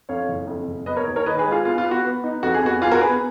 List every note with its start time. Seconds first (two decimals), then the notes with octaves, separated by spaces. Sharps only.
0.09 F2 C#5 F5
0.28 F#1
0.47 F2
0.67 F#1
0.86 B3 B4 D#5
0.96 A#4 C#5
1.06 D#2
1.16 A#4 C#5
1.26 D#3 B4 D#5
1.39 G#4 B4
1.45 G#3
1.51 F4 G#4
1.65 B3 F4
1.78 F4
1.85 B3
1.91 F#4
2.04 B3
2.24 D#4
2.43 F2 F#4
2.54 G#4
2.62 B3 F#4
2.81 B3 F4 G#4
2.91 F#4 A#4
3.01 B3 G#4 B4